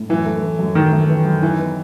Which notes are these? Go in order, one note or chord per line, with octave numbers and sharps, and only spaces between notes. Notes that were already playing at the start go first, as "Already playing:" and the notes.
Already playing: A2
F#2 E3
A3
E3
F#2
F#2 D#3
A3
E3
F#2
E3 D#4
B3